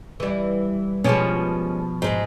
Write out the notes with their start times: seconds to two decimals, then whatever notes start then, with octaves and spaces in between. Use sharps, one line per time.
0.20 E3 G3
1.04 B2 F3 G#3 C#4 G4
2.02 G#2 G#3